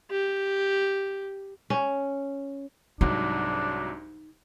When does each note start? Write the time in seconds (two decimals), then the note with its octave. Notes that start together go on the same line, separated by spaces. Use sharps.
0.11 G4
1.70 C#4
3.01 C2 G#2 F#3 D4 D#4